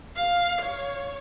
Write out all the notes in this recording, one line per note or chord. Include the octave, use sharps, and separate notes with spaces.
F5
C#5